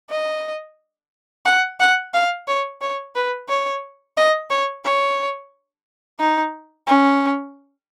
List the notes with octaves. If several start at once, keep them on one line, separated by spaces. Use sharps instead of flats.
D#5
F#5
F#5
F5
C#5
C#5
B4
C#5
D#5
C#5
C#5
D#4
C#4